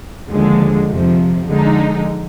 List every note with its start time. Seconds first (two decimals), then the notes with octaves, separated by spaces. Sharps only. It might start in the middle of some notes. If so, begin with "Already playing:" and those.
0.29 D#2 D3 F3 G#3
0.88 F2 C3 F3
1.48 D3 F3 G#3 D#4